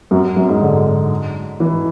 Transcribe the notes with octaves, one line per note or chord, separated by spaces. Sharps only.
F#2
F#2
G#2
D3
E3